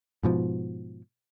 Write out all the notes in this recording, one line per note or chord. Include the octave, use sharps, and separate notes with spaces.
G#2 B2 F3